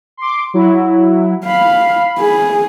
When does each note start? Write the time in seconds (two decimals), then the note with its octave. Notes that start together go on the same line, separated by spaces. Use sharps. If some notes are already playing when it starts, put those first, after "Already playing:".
0.17 C6 D6
0.54 F#3 E4
1.45 F5 B5
2.19 G#4